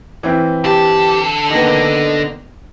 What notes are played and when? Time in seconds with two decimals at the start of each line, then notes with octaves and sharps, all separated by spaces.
0.23 E3 C4 E5
0.64 D3 G4 A5
1.50 D#3 A#3 B3 D#5